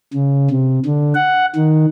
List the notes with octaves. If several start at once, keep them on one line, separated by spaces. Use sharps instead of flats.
C#3
C3
D3
F#5
D#3